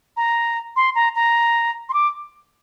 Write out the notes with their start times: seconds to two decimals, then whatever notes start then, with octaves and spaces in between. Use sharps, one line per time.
0.17 A#5
0.76 C6
0.95 A#5
1.15 A#5
1.89 C6
1.94 D6